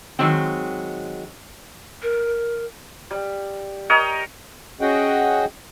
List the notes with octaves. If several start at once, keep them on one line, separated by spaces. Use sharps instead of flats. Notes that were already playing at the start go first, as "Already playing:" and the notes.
D#3 F#3 G#3 C4
A#4
G3
A#4 C#5 D#5 G5
C#4 F#4 G#4 D#5 F#5 G5